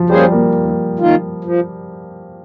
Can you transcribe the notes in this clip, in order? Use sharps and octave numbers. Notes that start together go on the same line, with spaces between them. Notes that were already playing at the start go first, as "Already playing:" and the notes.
Already playing: F3
G3 A#3 C#4 G#4 C5
A#3
D#2
D#3 A#3 F4
F3